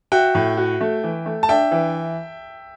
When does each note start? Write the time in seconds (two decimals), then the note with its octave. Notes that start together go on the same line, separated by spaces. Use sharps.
0.12 F#4 E5 G5
0.35 A2
0.57 F#4
0.81 A3
1.04 E3
1.26 A3
1.43 A5
1.49 D4 E5 G5
1.71 E3